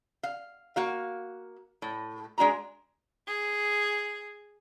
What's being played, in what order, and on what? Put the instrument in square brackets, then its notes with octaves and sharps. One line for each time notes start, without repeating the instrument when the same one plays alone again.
[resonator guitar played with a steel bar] F5
A#3 F#4 F5
A2
G#3 D4 F#4 A#5
[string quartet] G#4